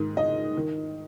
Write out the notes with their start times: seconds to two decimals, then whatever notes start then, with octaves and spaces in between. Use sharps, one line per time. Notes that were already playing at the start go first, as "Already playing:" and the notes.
Already playing: G#2 D#3
0.17 D#5
0.57 D#3